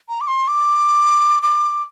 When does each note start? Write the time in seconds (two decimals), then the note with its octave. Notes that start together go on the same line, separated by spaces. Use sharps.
0.09 A#5
0.21 D6
0.28 C6
0.48 D6
1.43 D6